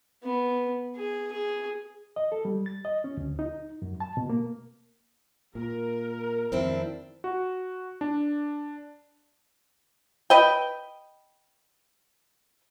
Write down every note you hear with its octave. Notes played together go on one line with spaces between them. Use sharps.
B3
G#4
G#4
D#5
A4
G3
A6
D#5
C#4
D2
D#4
F#2
A5
B2
A#3
A#2 A#4
F2 D#3 C4 D4 E4
F#4
D4
B4 D#5 G5